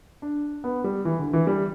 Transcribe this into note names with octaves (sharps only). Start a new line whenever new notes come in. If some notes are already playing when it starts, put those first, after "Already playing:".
D4
B3
G3
E3
D3
E3
G3